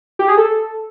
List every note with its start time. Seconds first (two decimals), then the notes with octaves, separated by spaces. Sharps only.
0.19 G4
0.28 G#4
0.37 A4